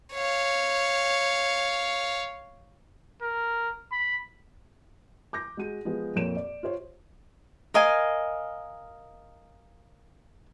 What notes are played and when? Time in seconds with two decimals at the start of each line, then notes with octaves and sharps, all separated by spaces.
0.14 C#5 F5
3.22 A#4
3.92 B5
5.33 D6 G6 A#6
5.57 G#3 F#4 D#7
5.85 F3 G#3 B3
6.15 F2 A#2 A#3 C#5 D7 E7
6.36 D5
6.63 F4 G4 C5 C#5
7.74 A#4 D#5 F5 G#5